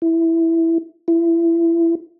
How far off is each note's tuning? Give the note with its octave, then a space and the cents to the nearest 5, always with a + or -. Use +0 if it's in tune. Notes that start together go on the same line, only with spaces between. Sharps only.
E4 +0
E4 +25